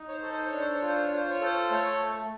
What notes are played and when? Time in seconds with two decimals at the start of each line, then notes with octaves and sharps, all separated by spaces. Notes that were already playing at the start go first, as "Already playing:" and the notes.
Already playing: D#4
0.08 C#5
0.12 C5
0.22 A4
0.32 C5
0.47 C#5
0.52 D4
0.60 C5
0.74 C#5
0.82 F4
0.88 C5
1.03 C#5
1.12 F4 C5
1.30 C#5
1.41 A4 C5
1.71 A3 C#5